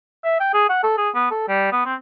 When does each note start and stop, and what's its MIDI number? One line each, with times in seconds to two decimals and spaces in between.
0.24 0.40 76
0.40 0.53 79
0.54 0.65 68
0.69 0.82 78
0.83 0.94 69
0.98 1.10 68
1.15 1.26 59
1.31 1.46 69
1.49 1.70 55
1.72 1.84 59
1.86 1.95 60